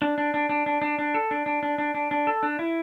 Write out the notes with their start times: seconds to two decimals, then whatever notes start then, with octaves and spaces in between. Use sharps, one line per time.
0.02 D4
0.18 D4
0.34 D4
0.49 D4
0.66 D4
0.82 D4
0.99 D4
1.14 A4
1.31 D4
1.46 D4
1.63 D4
1.78 D4
1.94 D4
2.11 D4
2.27 A4
2.43 D4
2.59 E4